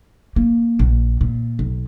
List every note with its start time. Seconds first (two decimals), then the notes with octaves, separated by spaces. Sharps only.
0.36 A#3
0.79 A#1
1.21 A#2
1.59 B1